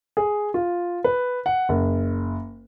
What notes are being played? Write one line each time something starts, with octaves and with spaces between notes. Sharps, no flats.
G#4
F4
B4
F#5
F#1